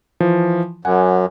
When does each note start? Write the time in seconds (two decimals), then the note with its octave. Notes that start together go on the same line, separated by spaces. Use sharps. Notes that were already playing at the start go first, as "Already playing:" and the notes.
0.20 E3 F3
0.85 F#2 F#5 G#5